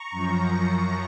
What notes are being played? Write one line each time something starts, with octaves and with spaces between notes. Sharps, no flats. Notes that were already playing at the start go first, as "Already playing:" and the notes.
Already playing: A#5 C#6
F#2 F3